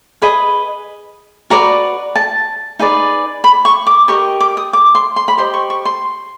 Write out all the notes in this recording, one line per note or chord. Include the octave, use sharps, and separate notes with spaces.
G#4 B4 D#5 B5
F#4 B4 D5 A#5
A5
D#4 G#4 B4 D5
B5
C#6
D6
G4 A#4 D#5 C#6
D6
D#6
D6
C6
C6
B5
G4 C5 D#5 C6
C#6
C#6
C6